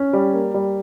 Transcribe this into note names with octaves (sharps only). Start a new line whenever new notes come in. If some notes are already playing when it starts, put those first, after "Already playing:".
Already playing: C#4
G3
A#3
G3